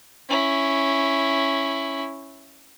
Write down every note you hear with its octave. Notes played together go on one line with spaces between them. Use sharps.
C#4 E4